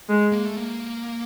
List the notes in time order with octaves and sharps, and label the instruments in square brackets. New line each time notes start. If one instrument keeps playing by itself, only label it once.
[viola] G#3
[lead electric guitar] A#3
A3
A#3